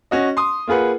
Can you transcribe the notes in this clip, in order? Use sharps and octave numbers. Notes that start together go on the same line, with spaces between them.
C#4 F#4 D#5
C6 D#6
A#3 F4 G#4 B4 F#5